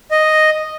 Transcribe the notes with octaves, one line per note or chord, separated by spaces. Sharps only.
D#5